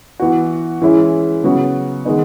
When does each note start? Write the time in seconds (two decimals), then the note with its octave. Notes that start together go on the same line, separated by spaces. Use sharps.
0.20 E3 B3 F#4
0.82 E3 G#3 C#4 E4
1.43 C#3 F#3 B3 F#4
2.05 D#3 G#3 B3 D#4